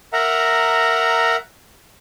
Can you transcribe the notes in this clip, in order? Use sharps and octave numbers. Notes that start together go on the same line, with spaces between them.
A#4 E5 F#5 A#5